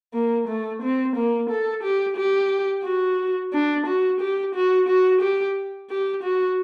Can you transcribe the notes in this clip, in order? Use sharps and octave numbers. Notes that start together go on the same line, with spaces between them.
A#3
A3
C4
A#3
A4
G4
G4
F#4
D4
F#4
G4
F#4
F#4
G4
G4
F#4